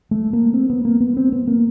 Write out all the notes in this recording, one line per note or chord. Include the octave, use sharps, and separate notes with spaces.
A3
A#3
C4
B3
A#3
B3
C4
B3
A#3